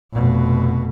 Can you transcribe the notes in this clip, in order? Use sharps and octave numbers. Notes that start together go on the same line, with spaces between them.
F1 B2